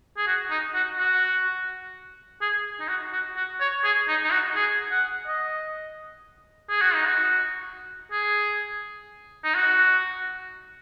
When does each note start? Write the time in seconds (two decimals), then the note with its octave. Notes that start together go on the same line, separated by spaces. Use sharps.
0.17 G#4
0.27 F#4
0.51 D#4
0.74 F#4
0.98 F#4
2.41 G#4
2.80 D#4
2.88 F#4
3.13 F#4
3.36 F#4
3.61 C#5
3.84 G#4
4.08 D#4
4.24 D#4
4.32 F#4
4.56 G#4
4.91 F#5
5.27 D#5
6.69 G#4
6.82 F#4
6.95 D#4
7.06 F#4
8.12 G#4
9.44 D#4
9.55 F#4